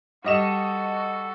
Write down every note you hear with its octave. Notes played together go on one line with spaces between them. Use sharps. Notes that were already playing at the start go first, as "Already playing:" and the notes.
G3 F#4 A4 D#5 E7